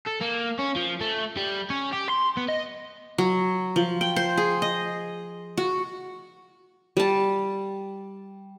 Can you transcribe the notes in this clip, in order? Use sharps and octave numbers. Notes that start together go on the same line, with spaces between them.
A4
A#3
C#4
F3
A3
G3
C#4
G4
C6
B3
D#5
F#3
F3
G5
C5
G#4
D#5
F#4
G3 A5